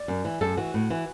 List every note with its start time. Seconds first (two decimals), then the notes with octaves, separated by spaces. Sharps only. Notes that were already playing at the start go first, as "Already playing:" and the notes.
Already playing: D5
0.08 F#2
0.25 E3
0.41 F#2 A4
0.57 E3 F#4
0.74 A2
0.90 E3